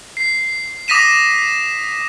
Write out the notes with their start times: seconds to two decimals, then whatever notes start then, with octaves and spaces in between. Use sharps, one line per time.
0.17 C7
0.88 D6 D#6 A#6 B6 D#7 E7